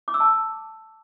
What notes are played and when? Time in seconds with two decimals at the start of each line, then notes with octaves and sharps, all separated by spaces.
0.08 D6
0.14 E6
0.20 A5